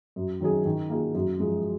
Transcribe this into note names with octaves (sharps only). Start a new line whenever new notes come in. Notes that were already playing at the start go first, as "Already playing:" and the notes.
F#2
D#3 F#3 C#4 G#4
D#3
A#3 F4 G#4
F#2
F3 G#3